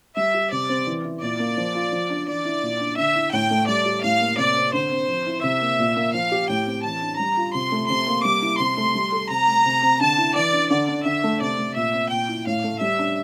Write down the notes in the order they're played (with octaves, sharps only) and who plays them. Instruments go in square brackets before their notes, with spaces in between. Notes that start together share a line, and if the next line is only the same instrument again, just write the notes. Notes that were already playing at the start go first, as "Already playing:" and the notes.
[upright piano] G3 [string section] E5
[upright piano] G4
[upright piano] C3 [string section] D5
[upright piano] C4
E3
E4
[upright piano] A#2 [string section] D5
[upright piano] A#3
F3
F4
F3
D4
[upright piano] E3 [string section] D5
[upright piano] E4
A#2
D4
[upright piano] D3 [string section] E5
[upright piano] E4
[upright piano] A2 [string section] G5
[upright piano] A3
[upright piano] G3 [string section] D5
[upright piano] G4
[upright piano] A2 [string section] F5
[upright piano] A#3
[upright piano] C3 [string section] D5
[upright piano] C4
[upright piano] D3 [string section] C5
[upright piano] C4
F3
E4
[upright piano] C3 [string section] E5
[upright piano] A#3
A#2
A#3
[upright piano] F3 [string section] F5
[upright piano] G4
[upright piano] A2 [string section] G5
[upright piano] C4
[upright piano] E3 [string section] A5
[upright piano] D4
[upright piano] G3 [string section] A#5
[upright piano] F4
[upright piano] C3 [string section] C6
[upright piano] A3
[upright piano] C3 [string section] C6
[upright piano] A#3
[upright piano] G3 [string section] D6
[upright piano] E4
[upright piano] C3 [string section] C6
[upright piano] A3
G3
A4
[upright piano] C3 [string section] A#5
[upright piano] A3
C3
C4
[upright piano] D3 [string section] A5
[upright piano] E4
[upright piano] E3 [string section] D5
[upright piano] D4
[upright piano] D3 [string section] D5
[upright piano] D4
[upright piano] D3 [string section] E5
[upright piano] A3
[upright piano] C3 [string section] D5
[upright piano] A3
[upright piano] A#2 [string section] E5
[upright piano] C4
[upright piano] A#2 [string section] G5
[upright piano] E4
[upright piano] A2 [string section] F5
[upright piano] A3
[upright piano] G3 [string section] E5
[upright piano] D4